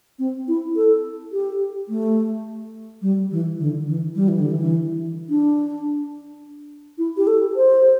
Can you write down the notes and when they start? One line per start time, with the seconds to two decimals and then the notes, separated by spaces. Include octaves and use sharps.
0.19 C4
0.48 E4
0.76 A4
1.32 G4
1.89 A3
3.02 G3
3.31 E3
3.59 D3
3.87 E3
4.16 G3
4.28 E3
4.39 D3
4.51 E3
5.29 D4
6.98 E4
7.17 G4
7.27 A4
7.56 C5